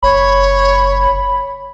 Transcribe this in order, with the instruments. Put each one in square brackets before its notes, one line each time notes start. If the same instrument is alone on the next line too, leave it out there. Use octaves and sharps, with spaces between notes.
[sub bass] F#1 [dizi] C#5 [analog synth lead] B5